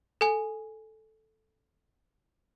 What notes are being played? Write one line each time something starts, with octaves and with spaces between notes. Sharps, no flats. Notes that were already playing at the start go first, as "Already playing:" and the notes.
A4 G#5